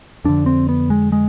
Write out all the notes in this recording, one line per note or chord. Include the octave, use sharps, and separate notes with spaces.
F2 D3 D4
C4
B3
G#3
G#3